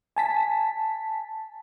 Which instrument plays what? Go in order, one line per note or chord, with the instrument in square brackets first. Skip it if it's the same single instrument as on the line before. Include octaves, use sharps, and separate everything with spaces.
[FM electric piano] G#5 A5 B6